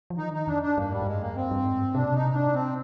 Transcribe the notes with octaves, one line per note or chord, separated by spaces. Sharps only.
F3
D#3 D#4
D#4
F2 D4
D4
G2 A#3
G#2 G3
G#2
G2 G#3
F2 A#3
G2 C4
G2
G#2
C3 D4
A#2
C3 D#4
D4
C4